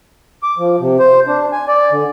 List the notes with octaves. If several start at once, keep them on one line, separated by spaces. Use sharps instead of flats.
D6
F3
C3
C5
D4
G#5
D5
D3